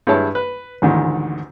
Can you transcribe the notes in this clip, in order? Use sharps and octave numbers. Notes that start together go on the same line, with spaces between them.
G2 G#3 E4 C#5 A5
B4
A1 D2 G#2 D3 D#3